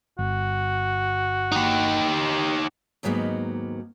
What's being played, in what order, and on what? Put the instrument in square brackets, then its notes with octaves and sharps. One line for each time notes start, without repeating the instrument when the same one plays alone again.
[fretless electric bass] G1 [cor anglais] F#4
[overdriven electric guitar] D#4 G4
[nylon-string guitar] D#2 G#2 F#3 A#3 B3 D#4